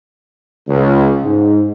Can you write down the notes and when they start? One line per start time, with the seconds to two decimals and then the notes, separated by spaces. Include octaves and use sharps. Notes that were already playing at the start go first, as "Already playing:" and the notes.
0.68 C#2
1.24 G#2